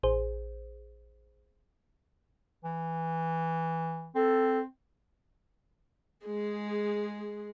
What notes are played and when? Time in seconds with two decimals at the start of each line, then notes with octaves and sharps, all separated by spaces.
0.03 A1 G#4 C5
2.64 E3
4.15 C4 A4
6.26 G#3 G#4